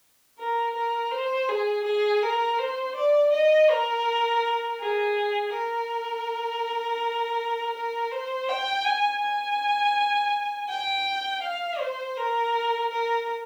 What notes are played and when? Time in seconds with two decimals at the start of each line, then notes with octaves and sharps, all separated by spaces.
0.38 A#4
0.75 A#4
1.12 C5
1.49 G#4
1.85 G#4
2.22 A#4
2.59 C5
2.96 D5
3.33 D#5
3.70 A#4
4.80 G#4
5.53 A#4
7.75 A#4
8.11 C5
8.49 G5
8.85 G#5
9.22 G#5
10.69 G5
11.43 F5
11.79 C5
12.17 A#4
12.91 A#4